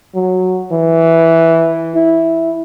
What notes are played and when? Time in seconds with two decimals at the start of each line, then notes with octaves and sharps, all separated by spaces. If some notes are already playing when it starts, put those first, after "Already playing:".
0.15 F#3
0.72 E3
1.95 E4